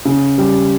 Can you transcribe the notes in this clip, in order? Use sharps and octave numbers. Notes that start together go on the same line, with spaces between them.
C#3
G3